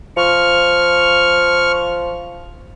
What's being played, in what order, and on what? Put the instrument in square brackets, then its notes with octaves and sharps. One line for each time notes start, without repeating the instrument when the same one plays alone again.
[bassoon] F3 [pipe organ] C#6 F6